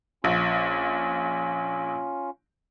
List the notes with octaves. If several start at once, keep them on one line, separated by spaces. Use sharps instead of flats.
A#1 C#4 F4